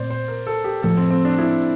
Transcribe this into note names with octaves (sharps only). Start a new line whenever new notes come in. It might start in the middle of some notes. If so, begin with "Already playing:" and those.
Already playing: A#2 A3 C4 C5 D5
C5
A#4
A4
G4
A2 F3 A3 A4
C4
C4
D4
E4